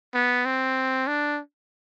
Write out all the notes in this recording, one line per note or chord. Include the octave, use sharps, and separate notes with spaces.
B3
C4
D4